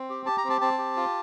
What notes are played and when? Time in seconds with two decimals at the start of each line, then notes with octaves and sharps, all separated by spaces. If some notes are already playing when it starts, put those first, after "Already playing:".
Already playing: C4
0.09 G4
0.26 G4 A5
0.38 A#5
0.44 C4
0.50 A5
0.61 C4 A5
0.78 G4
0.97 F4